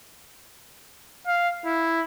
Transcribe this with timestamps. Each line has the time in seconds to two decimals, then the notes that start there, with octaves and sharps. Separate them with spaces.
1.27 F5
1.65 E4